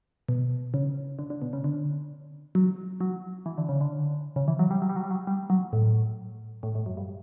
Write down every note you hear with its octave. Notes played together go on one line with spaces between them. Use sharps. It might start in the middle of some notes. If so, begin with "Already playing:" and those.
B2
C#3
D3
D3
B2
C#3
D3
F#3
F#3
E3
D3
C#3
D3
C#3
E3
F#3
G3
F#3
G3
F#3
G3
F#3
G3
F#3
A2
A2
A2
F#2
G2